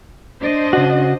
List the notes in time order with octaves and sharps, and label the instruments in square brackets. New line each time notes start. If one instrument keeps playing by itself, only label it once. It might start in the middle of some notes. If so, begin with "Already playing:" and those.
[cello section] D4 C5 D#5
[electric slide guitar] C#3 F#4